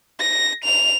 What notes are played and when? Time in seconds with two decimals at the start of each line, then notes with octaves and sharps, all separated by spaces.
0.20 A#6
0.64 F7